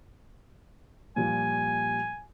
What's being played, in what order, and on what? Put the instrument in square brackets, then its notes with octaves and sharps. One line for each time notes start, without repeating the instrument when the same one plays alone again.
[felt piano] A#2 F3 G3 [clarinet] G#5